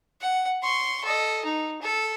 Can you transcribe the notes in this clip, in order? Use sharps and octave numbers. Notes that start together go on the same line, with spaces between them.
F#5
C6 C#6
A4 D#5
D#4
A4